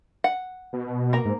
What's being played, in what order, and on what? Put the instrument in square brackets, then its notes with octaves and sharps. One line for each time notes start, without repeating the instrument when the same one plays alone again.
[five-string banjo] F#5
[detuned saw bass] B2
[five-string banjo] A#3 A#5
[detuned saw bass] G#2